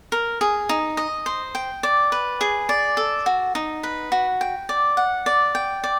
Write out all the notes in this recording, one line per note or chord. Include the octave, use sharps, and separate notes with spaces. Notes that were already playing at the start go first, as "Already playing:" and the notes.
A#4
G#4
D#4
D#5
C5
G5
D5
B4
G#4
D5
A4
F#4
D#4
B4
F#4
G5
D5
F#5
D5
G5
D5